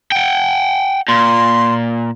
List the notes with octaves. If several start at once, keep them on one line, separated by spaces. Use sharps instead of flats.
F#5 G5
A#2 C6